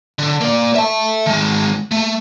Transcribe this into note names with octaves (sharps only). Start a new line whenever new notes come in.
D3
A#3 D5
E5 A5
D#3 G#3
A3